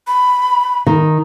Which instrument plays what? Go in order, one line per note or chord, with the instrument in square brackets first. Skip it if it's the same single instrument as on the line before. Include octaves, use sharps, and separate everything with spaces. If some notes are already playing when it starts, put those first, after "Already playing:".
[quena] B5
[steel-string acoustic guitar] D#3